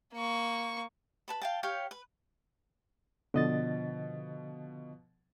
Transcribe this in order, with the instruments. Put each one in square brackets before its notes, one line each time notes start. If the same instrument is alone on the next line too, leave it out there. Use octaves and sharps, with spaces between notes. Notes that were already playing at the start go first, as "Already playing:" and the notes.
[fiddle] A#3 C#6
[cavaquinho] B4 A5 B5
F5 G5 A5
G4 C#5 F5 G5
B4
[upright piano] B2 F3 [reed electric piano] D3 D#5 A6